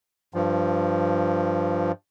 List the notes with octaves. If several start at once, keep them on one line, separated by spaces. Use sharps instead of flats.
G2 F3